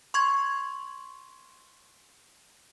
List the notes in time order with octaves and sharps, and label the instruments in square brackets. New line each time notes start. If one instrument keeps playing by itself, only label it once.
[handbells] C6 C#6 G#6